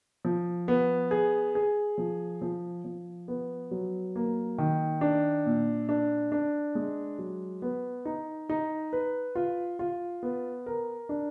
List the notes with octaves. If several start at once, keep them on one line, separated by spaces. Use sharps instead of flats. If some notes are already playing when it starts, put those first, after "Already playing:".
F3
B3
G#4
G#4
F3
F3
F3
B3
F#3
A#3
D#3
D4
A#2
D4
D4
G#3
F#3
B3
D#4
D#4
B4
F4
F4
B3
A#4
D4